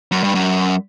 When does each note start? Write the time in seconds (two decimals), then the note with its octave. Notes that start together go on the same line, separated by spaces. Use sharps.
0.12 F#2
0.24 G2
0.35 F#2